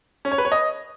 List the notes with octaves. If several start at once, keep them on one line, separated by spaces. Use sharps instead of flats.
C#4
C#5
B4
C#5
D#5